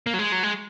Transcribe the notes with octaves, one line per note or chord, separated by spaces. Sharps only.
A#3
F#3
G#3
F#3
G#3